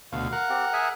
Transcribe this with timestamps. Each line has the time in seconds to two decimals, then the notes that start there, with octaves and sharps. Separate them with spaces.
0.12 D2 B2 F5
0.32 A#4 F#5
0.50 C4 G4
0.73 G#4 E5 G#5